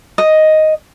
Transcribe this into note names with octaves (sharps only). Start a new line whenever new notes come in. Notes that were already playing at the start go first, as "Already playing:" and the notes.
D#5